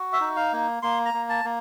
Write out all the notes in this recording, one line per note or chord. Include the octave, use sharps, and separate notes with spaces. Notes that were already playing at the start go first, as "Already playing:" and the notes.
Already playing: F#4
E5
D#4
F5
A#3
A#3 C6
A#5
A#3
A5
A#3